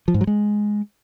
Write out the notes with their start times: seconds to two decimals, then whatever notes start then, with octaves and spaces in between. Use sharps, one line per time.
0.08 F3
0.14 G#2
0.21 F#3
0.27 G#3